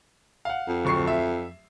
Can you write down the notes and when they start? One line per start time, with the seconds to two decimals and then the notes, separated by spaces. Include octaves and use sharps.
0.45 F5 F#5
0.68 F2
0.84 D1 C#6 C7
1.07 E5